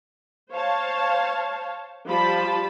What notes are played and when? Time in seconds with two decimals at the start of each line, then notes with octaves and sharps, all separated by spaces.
0.51 C5 C#5 F5 A5
2.07 F3 G3 F4 G4 A5 B5